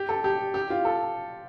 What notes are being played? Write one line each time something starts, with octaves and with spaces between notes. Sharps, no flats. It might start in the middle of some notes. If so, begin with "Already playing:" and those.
Already playing: G4
A4
G4
G4
F4
A4